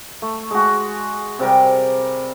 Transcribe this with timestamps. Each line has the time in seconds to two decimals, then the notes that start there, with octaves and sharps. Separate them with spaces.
0.22 A3
0.51 G#3 F#4
1.39 C3 G3 A#4